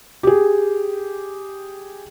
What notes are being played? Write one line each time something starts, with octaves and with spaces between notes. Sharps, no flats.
G4 G#4